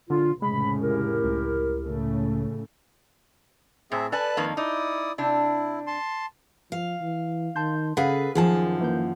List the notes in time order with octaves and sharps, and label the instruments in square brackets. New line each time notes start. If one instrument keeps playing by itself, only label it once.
[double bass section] A#1 [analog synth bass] D3 [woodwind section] F4
[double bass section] F1 A2 C#3 [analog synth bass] G#3 [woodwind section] B5
[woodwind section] E4 G4 A#4
[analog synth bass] C#2
[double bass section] A2 C#3 A3
[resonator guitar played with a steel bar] A2 [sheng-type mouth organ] C4 G#4 E5
[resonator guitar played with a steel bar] A4 D5 G#5 [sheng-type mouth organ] B4 A5 F#6
[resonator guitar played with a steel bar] F2 D#3 A#3
[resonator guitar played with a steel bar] D#4 [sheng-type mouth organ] E4 D5 D#6
[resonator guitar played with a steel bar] C3 D4 [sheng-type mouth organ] E4
[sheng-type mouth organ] A5 C6
[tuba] F3 [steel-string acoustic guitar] F5
[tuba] E3
[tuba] D#3 [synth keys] A5 C6 G6
[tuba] C#3 [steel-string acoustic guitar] G#4 A4 B4 [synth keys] F5 F#5
[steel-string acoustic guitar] F#2 F3 A5 [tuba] D#3 [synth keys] G#4 G#5
[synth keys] E3 A#3 G6